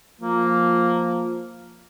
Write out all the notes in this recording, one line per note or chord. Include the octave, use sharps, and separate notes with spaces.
F3 A#3